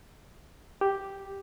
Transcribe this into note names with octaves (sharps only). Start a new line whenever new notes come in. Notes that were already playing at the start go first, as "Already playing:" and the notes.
G4